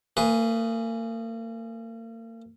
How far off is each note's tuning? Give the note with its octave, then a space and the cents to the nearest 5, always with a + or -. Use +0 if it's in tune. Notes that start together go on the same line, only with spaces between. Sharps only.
A#3 -40 G#4 +0 B4 +0